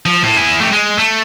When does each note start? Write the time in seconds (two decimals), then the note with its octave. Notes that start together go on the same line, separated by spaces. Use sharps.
0.06 F3
0.24 A2
0.37 E4 G#4
0.60 A3 G4
0.72 G#3
0.98 A3